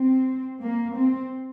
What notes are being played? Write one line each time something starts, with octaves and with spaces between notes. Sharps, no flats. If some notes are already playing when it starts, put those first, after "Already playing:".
Already playing: C4
A#3
C4